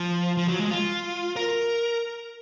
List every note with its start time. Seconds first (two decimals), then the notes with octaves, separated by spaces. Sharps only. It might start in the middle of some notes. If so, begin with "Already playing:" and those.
Already playing: F3
0.37 F3
0.48 F#3
0.59 G#3
0.71 F4
1.36 A#4